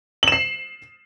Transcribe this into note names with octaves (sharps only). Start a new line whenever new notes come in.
C7 E7 F#7